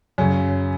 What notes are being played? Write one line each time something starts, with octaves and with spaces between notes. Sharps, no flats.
F#2 C#3 C#4